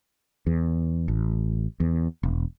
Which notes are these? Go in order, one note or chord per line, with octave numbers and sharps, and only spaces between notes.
E2
A1
E2
E1